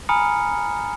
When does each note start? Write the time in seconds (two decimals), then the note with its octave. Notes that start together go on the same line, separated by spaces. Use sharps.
0.09 G#5 A#5 B5 D#6 F6 C#7